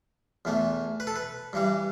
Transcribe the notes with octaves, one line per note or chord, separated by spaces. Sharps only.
E2 E3 A3
B4
A4
B4
G2 E3 G3